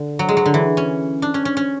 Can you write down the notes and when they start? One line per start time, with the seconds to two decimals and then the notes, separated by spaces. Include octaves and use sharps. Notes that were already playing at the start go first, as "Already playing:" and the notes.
Already playing: D3
0.19 F#3
0.29 G#3
0.37 F#3
0.45 D3
0.54 E3
0.77 C#4
1.22 D4
1.34 C#4
1.45 C#4
1.57 C#4